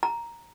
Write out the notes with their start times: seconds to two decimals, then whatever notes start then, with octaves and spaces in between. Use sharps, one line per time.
0.03 A#5